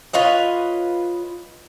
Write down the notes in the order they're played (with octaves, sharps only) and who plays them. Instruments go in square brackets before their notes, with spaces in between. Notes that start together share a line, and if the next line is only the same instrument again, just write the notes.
[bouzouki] F4 B4 C#5 D#5